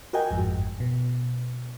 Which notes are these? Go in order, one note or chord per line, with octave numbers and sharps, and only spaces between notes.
F#4 A#4 D#5 G5 G#5
G1 F2 G#2
B2